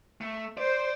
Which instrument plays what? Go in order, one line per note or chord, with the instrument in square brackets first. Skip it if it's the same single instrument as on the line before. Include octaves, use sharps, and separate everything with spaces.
[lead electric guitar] A3
[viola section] C5 [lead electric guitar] D5